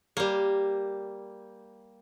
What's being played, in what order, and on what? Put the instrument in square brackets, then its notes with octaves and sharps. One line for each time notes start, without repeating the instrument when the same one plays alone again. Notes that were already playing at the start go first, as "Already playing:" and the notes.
[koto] G3 A#3